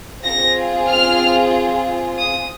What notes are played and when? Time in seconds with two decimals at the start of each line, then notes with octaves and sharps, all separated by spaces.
0.24 C4 F4 G#4 A#6
0.89 F6
2.19 D#6